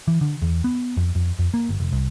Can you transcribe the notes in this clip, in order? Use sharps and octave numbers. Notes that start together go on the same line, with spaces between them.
E3
D3
E2
B3
F2
F2
F2
A#3
G1
F1
C2